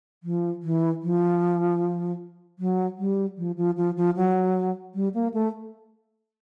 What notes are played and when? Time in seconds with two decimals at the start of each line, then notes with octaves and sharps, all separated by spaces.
0.23 F3
0.63 E3
1.03 F3
2.59 F#3
2.98 G3
3.38 F3
3.57 F3
3.77 F3
3.97 F3
4.16 F#3
4.95 G3
5.14 A#3
5.34 A3